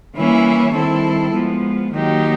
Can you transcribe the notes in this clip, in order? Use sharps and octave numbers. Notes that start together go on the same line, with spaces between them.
E3 G3 A#3 C#4 E4
D#3 G3 C4 E4 A4
F3 G#3 B3
D#3 F#3 A#3 D#4 G4